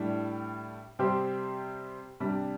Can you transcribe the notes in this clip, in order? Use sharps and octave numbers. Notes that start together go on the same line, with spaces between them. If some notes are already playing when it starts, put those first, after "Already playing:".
Already playing: A2 G3 D4
C3 G3 C4 G4 C5
C3 G3 D4 G4